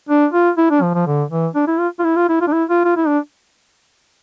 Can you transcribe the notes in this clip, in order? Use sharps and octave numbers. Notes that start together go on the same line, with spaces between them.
D4
F4
E4
D4
F3
F3
D3
E3
D4
E4
F4
F4
E4
F4
E4
F4
D4
E4
F4
F4
E4
D4